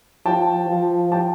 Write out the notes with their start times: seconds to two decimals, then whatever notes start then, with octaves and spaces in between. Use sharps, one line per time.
0.26 F3 G5 A5
0.69 F3
1.12 G5 A5